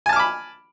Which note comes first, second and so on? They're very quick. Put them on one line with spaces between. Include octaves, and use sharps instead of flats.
G#5 A5 F6 D6 B5